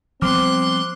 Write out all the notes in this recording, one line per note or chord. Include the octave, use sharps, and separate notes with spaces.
F3 G3 B3 C4 C6 D6 F6 F#6